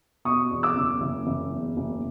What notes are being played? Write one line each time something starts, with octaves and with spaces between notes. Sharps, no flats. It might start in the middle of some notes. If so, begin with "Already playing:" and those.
B2 C#6 D#6
E2
D6 E6
F#1
F#1
F#1
E2
F#1